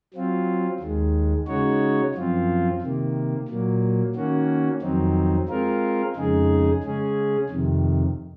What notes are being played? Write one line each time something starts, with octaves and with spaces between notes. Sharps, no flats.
F#3 C4 F4
D#2 D#3 G#3
C#3 G#3 D#4 F#4 C#5
F#2 F3 C4 F4
C3 D#3 A#3
A#2 F#3 A#3
D#3 A#3 C#4 F#4
F2 D#3 F#3 C4 D#4
G#3 C4 F4 A#4
F2 C#3 G#3 D#4 G#4
C#3 G#3 C#4 G#4
F2 C3 D#3